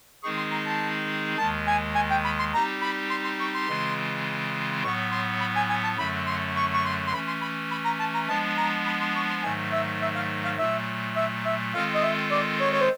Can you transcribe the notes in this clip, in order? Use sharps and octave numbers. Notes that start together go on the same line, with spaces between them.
D#3 G#3 C4 D#4 G#4 C#6
C6
A#5
A5
D#2 D#3 G#3 A5
G#5
G#5
G5
B5
C6
G3 C4 D#4 G4 A#5
B5
C6
C6
C#6
C6
C#3 E3 G#3 C4 F4
A2 F#3 B3 C#6
C6
B5
G#5
G#5
A5
F#2 D3 F#3 A3 B5
C6
C#6
C#6
C6
C6
E3 A3 C#4 B5
C6
B5
B5
A#5
A5
A#5
F3 G#3 B3 D4 A5
A#5
B5
C6
C#6
C6
G#2 D#3 F#3 A3 G#5
E5
E5
F5
F5
A#2 F#3 A3 E5
E5
E5
D#3 G#3 C4 F4 A4 F5
D#5
E5
D5
C#5
C#5
C5